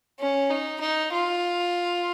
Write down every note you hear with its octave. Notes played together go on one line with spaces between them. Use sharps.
C#4
D#4
D#4
F4